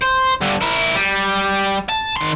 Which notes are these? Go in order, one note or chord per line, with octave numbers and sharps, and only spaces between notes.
C5
G2 D3
E4 A#4
G3
A5
D#3 C6